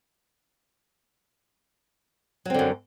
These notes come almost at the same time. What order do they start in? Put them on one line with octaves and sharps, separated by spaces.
F#3 C4 D3 F#2